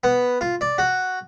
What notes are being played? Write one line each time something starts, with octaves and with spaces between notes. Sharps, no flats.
B3
F4
D5
F#4